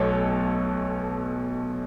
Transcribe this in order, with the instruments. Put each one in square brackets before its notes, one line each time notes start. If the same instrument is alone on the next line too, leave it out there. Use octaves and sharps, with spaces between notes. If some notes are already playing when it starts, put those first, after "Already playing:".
Already playing: [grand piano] B1 B2 A3 A4 C#5